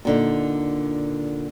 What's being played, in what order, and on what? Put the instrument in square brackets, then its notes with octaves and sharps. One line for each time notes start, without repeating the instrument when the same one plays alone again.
[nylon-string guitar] A#2 D3 D#4